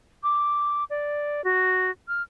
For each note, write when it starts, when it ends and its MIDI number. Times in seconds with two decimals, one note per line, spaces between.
0.23 0.84 86
0.90 1.44 74
1.44 1.91 66
2.08 2.22 89